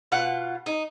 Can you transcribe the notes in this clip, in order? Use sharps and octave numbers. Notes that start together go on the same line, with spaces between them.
B2 F4 F#5
D#4